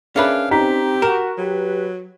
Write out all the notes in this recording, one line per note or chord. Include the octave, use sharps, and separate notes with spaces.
C#4 D4 G#4 A#4 B4 E5 F5
C4 D#4 G4 A#5 B6
F#4 A#4 E7
F#3 G4 B4